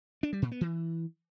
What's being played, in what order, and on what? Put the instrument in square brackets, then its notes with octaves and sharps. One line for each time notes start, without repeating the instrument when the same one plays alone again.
[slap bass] D4
G3
A#2
B3
E3